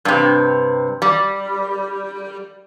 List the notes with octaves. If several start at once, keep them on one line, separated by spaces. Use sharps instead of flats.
G2 C3
G3